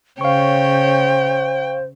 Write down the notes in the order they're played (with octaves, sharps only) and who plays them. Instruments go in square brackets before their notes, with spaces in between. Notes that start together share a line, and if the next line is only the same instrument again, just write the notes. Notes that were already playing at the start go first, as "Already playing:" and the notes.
[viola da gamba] C#3 C#5 [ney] C5 [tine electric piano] F5 C#6 [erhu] G5